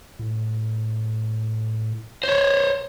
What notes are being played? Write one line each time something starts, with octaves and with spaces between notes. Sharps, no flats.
A2
C5 C#5